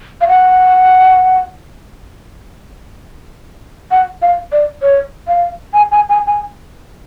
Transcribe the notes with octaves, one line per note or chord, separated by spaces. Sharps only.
F5
F#5
F#5
F5
D5
C#5
F5
G#5
G#5
G#5
G#5